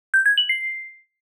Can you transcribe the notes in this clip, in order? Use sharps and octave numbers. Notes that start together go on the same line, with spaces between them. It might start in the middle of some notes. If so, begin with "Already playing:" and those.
G6
G#6
F#7
C7